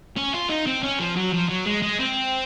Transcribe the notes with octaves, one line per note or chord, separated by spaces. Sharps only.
C#4
F4
D#4
C4
C#4
F3
F#3
F3
F#3
G#3
G#3
C4